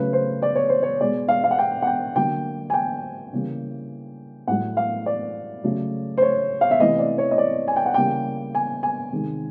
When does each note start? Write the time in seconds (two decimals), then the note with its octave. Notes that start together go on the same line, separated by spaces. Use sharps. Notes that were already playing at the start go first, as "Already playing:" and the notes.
Already playing: C#3 F#3 A3 B4
0.13 C5
0.42 D5
0.55 C#5
0.69 C5
0.83 C#5
1.00 B2 G#3 D5
1.28 F5
1.44 F5
1.51 F#5
1.59 G5
1.82 F#5
1.87 G5
2.16 D3 F#3 A#3 G5
2.70 G#5
2.74 G5
3.33 C#3 E3 G3 A#3
4.47 A2 F#3 A3 F#5
4.77 F5
5.06 D5
5.64 C#3 F#3 A3
6.18 C5
6.22 C#5
6.61 F5
6.71 E5
6.80 C3 E3 A3 D#5
6.99 D5
7.18 C#5
7.31 D#5
7.38 D5
7.68 G#5
7.76 G5
7.86 F#5
7.94 C#3 E3 G3 A#3 G5
8.55 G#5
8.83 G#5
9.12 C3 D#3 G#3